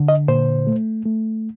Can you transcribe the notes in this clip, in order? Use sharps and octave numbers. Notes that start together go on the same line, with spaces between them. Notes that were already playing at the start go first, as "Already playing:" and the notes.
Already playing: D3
D#5
A#2 C5
A3
A3